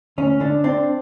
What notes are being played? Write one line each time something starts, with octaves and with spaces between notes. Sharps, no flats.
D2 C#4
D3 D4
C4 D4